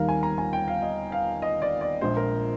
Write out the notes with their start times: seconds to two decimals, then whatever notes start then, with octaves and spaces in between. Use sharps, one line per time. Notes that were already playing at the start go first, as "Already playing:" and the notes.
Already playing: D#2 D#3 G3 A#4 F5
0.09 G#5
0.23 A#5
0.38 G#5
0.53 G5
0.68 F5
0.82 D#5
1.12 F5
1.42 D#5
1.62 D5
1.81 D5
2.01 A#1 A#2 G#3 C5
2.17 A#4